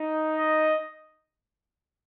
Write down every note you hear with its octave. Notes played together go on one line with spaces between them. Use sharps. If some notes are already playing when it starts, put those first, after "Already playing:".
Already playing: D#4
D#5